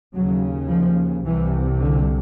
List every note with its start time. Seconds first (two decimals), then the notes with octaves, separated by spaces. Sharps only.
0.15 D#2 C#3 F#3
0.70 F3
1.25 C2 C3 E3
1.81 D3